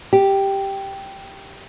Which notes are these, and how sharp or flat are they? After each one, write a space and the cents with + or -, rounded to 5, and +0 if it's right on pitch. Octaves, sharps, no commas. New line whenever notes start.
G4 +0